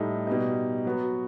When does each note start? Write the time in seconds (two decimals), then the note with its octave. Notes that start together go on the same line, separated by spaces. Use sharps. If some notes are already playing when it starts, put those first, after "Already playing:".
Already playing: A2 G3 D#4 A4
0.27 B2 G3 D#4
0.85 F#3 B3 F#4